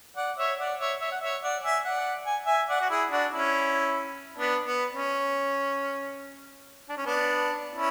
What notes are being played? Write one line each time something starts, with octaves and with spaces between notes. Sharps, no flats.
D5 F#5
C#5 E5
D5 F#5
C#5 E5
C#5 E5
F#5
C#5 E5
D5 F#5
E5 G#5
D5 F#5
G#5
E5 G#5
D5 F#5
F#4
E4 G#4
D4 F#4
C#4 E4
B3 D4
B3
C#4
D4
C#4
B3 D4
C#4 E4